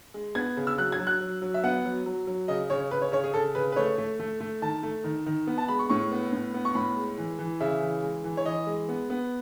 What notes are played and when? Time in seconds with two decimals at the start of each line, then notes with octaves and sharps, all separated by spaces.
0.14 G#3
0.35 B3 G#6
0.57 C#3
0.67 E6
0.78 F#3 F#6
0.92 G#6
1.00 F#3
1.07 F#6
1.21 F#3
1.42 F#3
1.54 E5
1.64 B3 F#5
1.85 F#3
2.06 F#3
2.27 F#3
2.48 C#3 D#5
2.70 C#3 C#5
2.91 C#3 B4
3.02 C#5
3.12 C#3 C#5
3.24 G#4
3.34 C#3 A4
3.55 C#3 B4
3.72 B4
3.76 A3 C#5
3.98 A3
4.20 A3
4.41 A3
4.62 D#3 A5
4.83 A3
5.04 D#3
5.26 D#3
5.47 B3
5.58 A5
5.68 G#3 B5
5.79 C#6
5.89 A2 C#6
6.11 B3
6.33 A2
6.54 B3
6.65 C#6
6.75 A2 B5
6.96 G#3
7.18 E3
7.39 E3
7.60 C#3 E5
7.81 E3
8.03 G#3
8.24 E3
8.37 C#5
8.45 E3 D#5
8.67 G#3
8.88 B3
9.10 B3